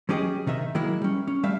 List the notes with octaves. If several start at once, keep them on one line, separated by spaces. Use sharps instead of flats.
F#3 C#4 G4 G#4 C#5 D#5
C3 D#3 D#4 E5
D#3 F#3 G#3 A#3 E4
G3 C#4
C#4
G3 A3 E5 F5